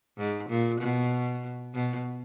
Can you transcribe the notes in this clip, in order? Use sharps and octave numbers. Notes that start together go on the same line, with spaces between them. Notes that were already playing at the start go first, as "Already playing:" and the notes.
G#2
A#2
B2
B2